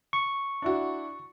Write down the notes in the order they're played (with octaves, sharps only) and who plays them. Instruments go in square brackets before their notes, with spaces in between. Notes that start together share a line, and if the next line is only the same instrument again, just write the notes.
[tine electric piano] C#6
[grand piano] D4 E4 F#4